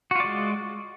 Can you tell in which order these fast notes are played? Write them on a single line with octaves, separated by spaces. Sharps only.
F#4 F4 D5 G#3